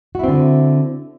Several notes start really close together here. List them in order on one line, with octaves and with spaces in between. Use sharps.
F#4 E4 C4 D3